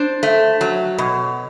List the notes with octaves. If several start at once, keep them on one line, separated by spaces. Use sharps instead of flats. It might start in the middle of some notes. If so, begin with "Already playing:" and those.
Already playing: D4 C5
A3
F#3
B2